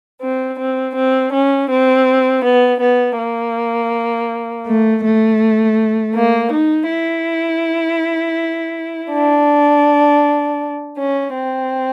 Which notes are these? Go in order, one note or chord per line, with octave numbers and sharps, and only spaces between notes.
C4
C4
C4
C#4
C4
B3
B3
A#3
A3
A3
A#3
D#4
E4
D4
C#4
C4